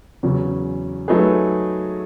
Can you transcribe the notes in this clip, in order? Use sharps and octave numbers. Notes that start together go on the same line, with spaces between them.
E2 C#3 F#3 C#4
F#3 A3 D#4 G#4 B4